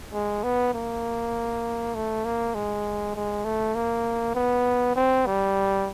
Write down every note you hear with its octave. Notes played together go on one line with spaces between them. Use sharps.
G#3
B3
A#3
A3
A#3
G#3
G#3
A3
A#3
B3
C4
G3